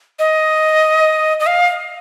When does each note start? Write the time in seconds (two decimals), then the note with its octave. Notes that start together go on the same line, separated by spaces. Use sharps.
0.19 D#5
1.40 D#5
1.47 F5